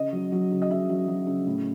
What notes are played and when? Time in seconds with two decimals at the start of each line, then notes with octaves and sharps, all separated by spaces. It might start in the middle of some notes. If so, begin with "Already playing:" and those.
Already playing: C#3 D#5
0.13 F#3
0.32 F#3
0.51 C#3
0.62 D#5
0.70 C#3 E5
0.89 F#3
1.08 F#3
1.27 C#3
1.47 A2